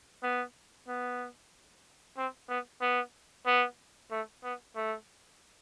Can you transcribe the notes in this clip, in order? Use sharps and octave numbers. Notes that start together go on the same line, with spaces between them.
B3
B3
C4
B3
B3
B3
A3
B3
A3